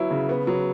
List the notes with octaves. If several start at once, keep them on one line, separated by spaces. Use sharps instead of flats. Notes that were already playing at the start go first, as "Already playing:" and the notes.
Already playing: F#3 B3 E4
C#3
B3
F#3